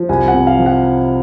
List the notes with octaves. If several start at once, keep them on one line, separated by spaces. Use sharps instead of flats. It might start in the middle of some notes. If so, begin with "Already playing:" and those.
Already playing: F3
C2 G#5
F#5
C3
F5
F3
F#5